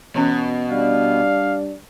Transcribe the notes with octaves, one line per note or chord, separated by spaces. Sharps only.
B2 E3 C#4
G3 D4 F5